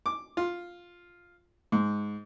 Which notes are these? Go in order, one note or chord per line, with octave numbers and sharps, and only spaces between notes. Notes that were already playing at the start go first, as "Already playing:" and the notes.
D6
F4
G#2